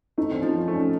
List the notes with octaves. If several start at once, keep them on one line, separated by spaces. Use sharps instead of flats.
A3 D#4
C4
C#4
F3
C4
A3
C#4